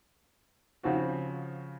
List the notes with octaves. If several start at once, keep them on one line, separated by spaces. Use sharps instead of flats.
C#3 F3 C4 F#4